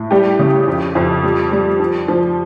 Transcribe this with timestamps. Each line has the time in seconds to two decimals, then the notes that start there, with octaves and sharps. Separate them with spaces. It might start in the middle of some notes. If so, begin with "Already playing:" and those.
Already playing: A2
0.11 G3 G4
0.39 C#3
0.67 F2
0.95 F2
1.23 G3
1.52 G3
1.80 F3
2.08 F3